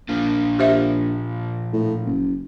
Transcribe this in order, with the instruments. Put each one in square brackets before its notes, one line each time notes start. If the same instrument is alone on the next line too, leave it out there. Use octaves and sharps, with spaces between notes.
[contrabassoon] A#1 [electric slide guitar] A#2 F3 F4
[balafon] G4 C5 E5
[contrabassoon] A2
F#1